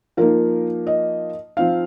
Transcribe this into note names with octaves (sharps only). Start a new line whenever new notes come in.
F3 A#3 D#4 A#4
D#5
F3 C4 D#4 F5